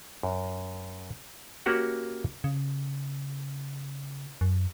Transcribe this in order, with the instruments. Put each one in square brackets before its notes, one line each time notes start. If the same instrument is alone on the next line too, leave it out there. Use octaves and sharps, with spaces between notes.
[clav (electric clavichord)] F#2
A#3 C#4 F#4 G4 F#5
[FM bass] C#3
F#2